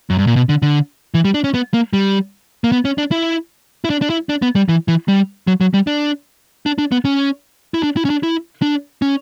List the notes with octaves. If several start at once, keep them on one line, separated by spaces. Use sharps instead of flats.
F#2
G2
A#2
B2
D3
D3
E3
G3
D4
C#4
B3
A#3
G3
A#3
B3
C#4
D4
E4
E4
D4
D4
E4
D4
B3
G3
E3
E3
G3
F#3
F#3
G3
D4
D4
D4
B3
C#4
E4
D4
E4
C#4
D4
E4
D4
C#4